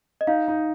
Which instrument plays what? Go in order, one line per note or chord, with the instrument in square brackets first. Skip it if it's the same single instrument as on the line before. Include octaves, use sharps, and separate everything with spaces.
[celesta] D#5
[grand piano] D#4 [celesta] F5
[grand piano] D#4